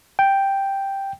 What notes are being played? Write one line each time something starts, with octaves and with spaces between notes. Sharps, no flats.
G5